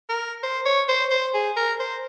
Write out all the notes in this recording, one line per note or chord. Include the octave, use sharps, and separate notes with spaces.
A#4
C5
C#5
C5
C5
G#4
A#4
C5